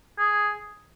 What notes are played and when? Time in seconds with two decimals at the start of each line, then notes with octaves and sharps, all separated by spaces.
0.18 G#4